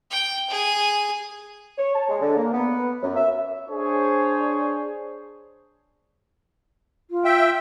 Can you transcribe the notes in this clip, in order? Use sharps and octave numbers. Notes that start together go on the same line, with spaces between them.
G5
G#4
C#5
A5
G#3
D3
A#3
B3
F#2
E5
D4 G#4 C5 C#5
F4
E5 G5